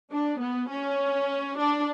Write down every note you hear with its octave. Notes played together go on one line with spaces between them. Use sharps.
D4
B3
C#4
D4